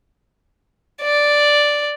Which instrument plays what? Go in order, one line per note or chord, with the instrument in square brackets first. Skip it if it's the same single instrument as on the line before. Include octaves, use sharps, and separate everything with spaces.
[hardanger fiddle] D5